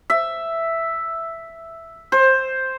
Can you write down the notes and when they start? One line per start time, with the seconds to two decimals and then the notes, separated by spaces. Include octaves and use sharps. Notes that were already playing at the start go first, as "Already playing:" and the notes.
0.10 E5
2.12 C5